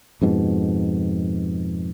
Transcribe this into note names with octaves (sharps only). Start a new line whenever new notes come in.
F2 G#2 B2